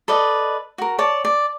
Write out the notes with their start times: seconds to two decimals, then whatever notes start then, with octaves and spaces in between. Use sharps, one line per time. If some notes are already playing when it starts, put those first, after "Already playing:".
0.08 A4 B4 D5 D#5
0.78 F#4 A#4
0.99 C#5 D5 A5
1.25 D5